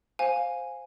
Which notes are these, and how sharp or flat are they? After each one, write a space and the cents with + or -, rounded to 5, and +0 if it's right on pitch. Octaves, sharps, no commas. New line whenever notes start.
C5 +0 F5 +15 G#5 -5